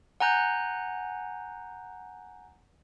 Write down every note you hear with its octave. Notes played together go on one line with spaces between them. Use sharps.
F#5 G#5 A#5 F#6 G6